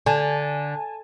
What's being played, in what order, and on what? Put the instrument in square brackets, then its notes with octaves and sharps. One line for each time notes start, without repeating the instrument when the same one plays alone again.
[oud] D3 [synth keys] G#5 A5